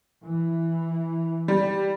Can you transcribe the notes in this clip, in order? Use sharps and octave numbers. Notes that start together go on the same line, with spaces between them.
E3
G3